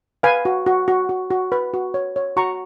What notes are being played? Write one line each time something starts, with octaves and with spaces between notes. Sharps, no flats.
B4 F5 G#5
F#4
F#4
F#4
F#4
F#4
B4
F#4
C#5
C#5
F#4 A#5 C#6